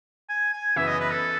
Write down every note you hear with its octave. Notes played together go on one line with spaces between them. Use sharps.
G#5
G#5
F#2 C#3 E3 B3 E5
D#5
B4
A4